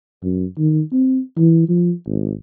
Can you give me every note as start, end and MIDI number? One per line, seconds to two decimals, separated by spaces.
0.22 0.45 42
0.58 0.81 51
0.92 1.20 60
1.36 1.65 52
1.68 1.92 53
2.06 2.33 32